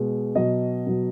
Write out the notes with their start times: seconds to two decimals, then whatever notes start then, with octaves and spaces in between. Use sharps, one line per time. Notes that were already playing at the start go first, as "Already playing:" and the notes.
Already playing: B2 G#3
0.35 B2 F#3 D#5
0.87 B2 F#3